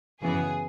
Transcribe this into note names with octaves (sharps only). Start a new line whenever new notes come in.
F#2 C#3 E3 B3 G#4